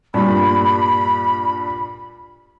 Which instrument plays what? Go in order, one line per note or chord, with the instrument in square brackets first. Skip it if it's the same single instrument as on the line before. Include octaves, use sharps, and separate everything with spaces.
[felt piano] G2 A#2 G3 [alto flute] B5